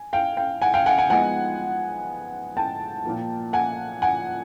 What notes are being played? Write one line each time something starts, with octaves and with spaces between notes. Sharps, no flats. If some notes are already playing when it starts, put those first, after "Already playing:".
Already playing: G#5
F5 G5
F5 G5
F#5 G#5
F5 G5
F#5 G#5
F#5 G#5
F3 G#3 B3 D#4 F#5 G#5
G5 A5
A#2 F3 A#3
F#5 G#5
F#5 G#5